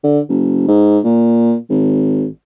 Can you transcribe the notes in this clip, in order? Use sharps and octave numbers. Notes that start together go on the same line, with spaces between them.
D3
F#1
G#2
A#2
G#1